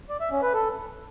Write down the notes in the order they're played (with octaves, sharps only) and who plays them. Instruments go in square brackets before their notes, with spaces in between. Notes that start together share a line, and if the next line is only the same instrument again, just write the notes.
[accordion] D5
E5
C#4
B4
A4